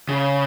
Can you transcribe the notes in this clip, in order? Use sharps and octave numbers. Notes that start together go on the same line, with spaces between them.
C#3